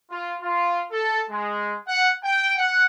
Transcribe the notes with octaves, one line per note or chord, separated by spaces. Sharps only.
F4
F4
A4
G#3
F#5
G5
F#5